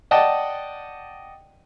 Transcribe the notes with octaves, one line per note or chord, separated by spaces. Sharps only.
D5 D#5 F#5 G5 A5